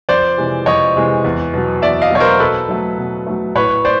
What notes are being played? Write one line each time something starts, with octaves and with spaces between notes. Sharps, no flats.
F2 C5 D5
C3 E3 G#3
F2 C#5 D#5
C3 E3 G#3
E2
B2 F#3
E2 D5 E5
D#5 F5
B2 F#3 C#5
A#4 C5
B2 A4 B4
F#3 A3
B2
F#3 A3
A2 B4 C#5
C5 D5